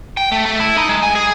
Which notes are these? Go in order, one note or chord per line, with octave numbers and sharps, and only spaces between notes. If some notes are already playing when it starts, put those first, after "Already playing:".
G5
A3
A3
E4
D#4
G#3
G#5
G#4